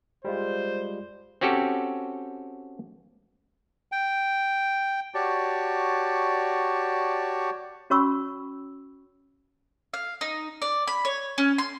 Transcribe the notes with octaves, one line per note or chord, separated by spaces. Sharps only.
G3 G#3 F4 C5
C4 C#4 F#4 G4 A4
G5
F#4 G4 C#5 D5 A5
C#4 F#4 C#5 B5 C#6 E6
F5
D#4
D5
B5
C#5
C#4
C6